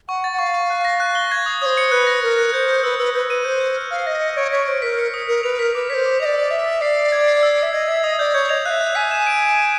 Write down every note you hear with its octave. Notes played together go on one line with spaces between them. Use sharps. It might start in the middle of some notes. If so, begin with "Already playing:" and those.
F#5 C#6
A6
F#5
F5 C#6
C#6
F#6
A#6
F#6
G7
G#6
D#6
C5 C#5 D#6
C#7
B4 F#6
A#6
A#4 A#6
F#6
C5 G6
G6
B4 E6
B4 E6
B4 G6
B4 D#7
C5 G6
G6
F6
F5 F6
D#5 A#6
C#7
C#5 D7
C#5 B6
C5 D7
A#4 B6
C#7
D#6
A#4 C#7
B4 F7
A#4 B6
B4 D6
C5 C#5 B6
D6
D#5 F7
D5
E6
E5 F7
E6
D5 C7
C7
G#6
C7
E6
E5 C7
D#5 G#6
E5 G#6
D#5 D#6
D5 G6
C#5 G6
D#5 F7
E5 F5 F#6
F#6
G#5 B6
E7
D7
D7
D7